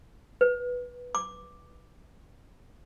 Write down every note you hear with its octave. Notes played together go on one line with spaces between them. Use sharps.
B4
D6